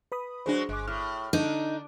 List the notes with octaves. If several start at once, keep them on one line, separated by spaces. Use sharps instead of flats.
B4 B5 D#6
F#3 G#3 D4 F#4 G#4 C5
G1 G#3 D6
A2 F6
D3 D4 D#4